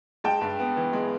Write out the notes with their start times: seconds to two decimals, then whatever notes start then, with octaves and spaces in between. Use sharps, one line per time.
0.24 G#3 G5 A5
0.41 G2
0.60 B3
0.77 E3
0.93 G#3